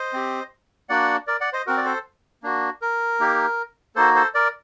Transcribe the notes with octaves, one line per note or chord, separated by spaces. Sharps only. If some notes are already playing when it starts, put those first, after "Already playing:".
Already playing: C5 D#5
C4 G4
A#3 D4 F#4 D5 F#5
A#4 D5
D5 F#5
C5 D#5
C4 F#4 A#4
D5
A4 C5
A#3 D4 F#4
A#4
A#3 D#4 G4
A#3 D#4 F#4 A4 C5
A4 C5
A#4 D5